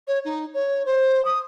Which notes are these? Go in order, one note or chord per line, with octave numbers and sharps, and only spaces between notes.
C#5
D#4
C#5
C5
D#6